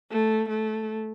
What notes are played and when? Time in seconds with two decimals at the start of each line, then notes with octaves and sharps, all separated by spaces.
0.11 A3
0.49 A3